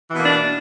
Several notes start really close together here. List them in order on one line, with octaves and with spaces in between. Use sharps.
E3 B2 A#3 D4